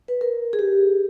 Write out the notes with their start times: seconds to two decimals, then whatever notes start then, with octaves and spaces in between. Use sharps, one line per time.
0.08 B4
0.21 A#4
0.53 G#4
0.59 G4